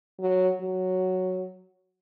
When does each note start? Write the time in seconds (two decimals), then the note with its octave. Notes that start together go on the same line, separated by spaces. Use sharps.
0.20 F#3
0.61 F#3